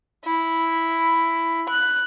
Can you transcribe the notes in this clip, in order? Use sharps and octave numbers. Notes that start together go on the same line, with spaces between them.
E4
F#6